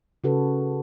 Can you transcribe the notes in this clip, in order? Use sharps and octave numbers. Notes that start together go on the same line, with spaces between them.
C#3 F#4 A4 B4